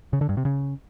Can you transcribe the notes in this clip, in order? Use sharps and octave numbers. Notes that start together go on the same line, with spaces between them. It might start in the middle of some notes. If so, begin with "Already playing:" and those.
C#3
D3
G2
C3
C#3